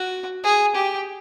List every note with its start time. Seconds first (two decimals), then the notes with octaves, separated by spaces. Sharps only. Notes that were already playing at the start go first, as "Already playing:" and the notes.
Already playing: F#4
0.44 G#4
0.75 G4